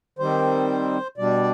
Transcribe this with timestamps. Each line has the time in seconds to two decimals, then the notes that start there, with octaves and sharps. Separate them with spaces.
0.19 D#3 G3 C4 C5
1.18 B2 G3 D4 D5